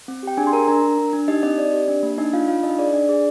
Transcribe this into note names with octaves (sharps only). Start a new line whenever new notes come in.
C4
G4 G5
D4 G#4 G#5
C6
D4 A#4 A#5
D4 A#4 A#5
D4
D4
D4
D#4 G4 D#5
C4 D#4 D#5
C4 D5
G4
D4
A#3
D4 D#4 D#5
D4 F4 F5
D4 F4 F5
D4 D#4 D#5
G#4 D5
D4 D5
G#4